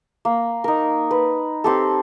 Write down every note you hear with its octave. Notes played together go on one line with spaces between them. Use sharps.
A#3
D#4 A#4
B4
C4 G4 A4